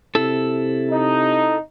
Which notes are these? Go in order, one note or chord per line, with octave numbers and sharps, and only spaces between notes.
C3 E4 A4
D#4